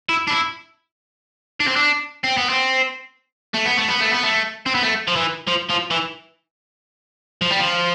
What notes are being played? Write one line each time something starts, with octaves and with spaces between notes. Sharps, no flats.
E4
D4
E4
D4
C4
D4
C4
B3
C4
A3
B3
A3
B3
A3
B3
A3
C4
B3
A3
F3
E3
F3
F3
E3
F3
G3
F3